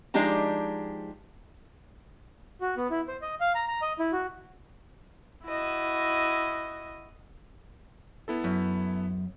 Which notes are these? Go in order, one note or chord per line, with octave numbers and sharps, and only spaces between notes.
F3 G#3 D4 D#4 G4 A#5
F#4
B3
E4
C5
D#5
F5
A#5
A#5
D#5
E4
F#4
E4 F#4 D#5
B3 E4 A4
F#2